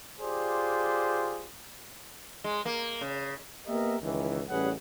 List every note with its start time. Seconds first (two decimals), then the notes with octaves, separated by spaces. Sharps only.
0.20 F4 G4 G#4 C5 D5
2.44 G#3
2.66 A#3
3.01 C#3
3.66 A#3 B3 G4 A#4 D#5 E5
4.01 C#2 D#3 E3
4.48 A1 G3 C#4 G#4 B4 F#5